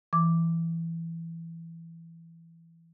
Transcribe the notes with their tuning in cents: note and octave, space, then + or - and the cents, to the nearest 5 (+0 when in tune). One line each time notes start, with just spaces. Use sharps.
E3 +10 D6 +0